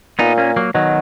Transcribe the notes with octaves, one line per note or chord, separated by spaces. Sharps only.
A#2 B3 D#4
A#3 C#4
F#3 A#3
B2 D#3 F#3